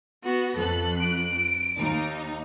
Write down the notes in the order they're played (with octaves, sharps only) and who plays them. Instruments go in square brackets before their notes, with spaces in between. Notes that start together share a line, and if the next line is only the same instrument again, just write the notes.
[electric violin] B3 F#4
[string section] F2 F#6 [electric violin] A4
[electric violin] D7
[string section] D#2 D#4